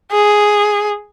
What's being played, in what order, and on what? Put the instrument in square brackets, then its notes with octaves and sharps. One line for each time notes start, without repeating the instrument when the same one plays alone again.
[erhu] G#4